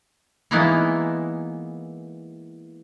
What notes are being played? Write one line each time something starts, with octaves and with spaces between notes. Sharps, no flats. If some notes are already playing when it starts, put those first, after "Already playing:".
E3 G#3 A#3 B3 D#4 E4